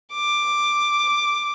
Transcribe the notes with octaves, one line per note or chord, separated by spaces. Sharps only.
D6